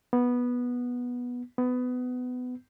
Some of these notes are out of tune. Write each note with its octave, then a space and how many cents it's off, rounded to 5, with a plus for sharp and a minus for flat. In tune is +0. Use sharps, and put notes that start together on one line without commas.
B3 -10
B3 +20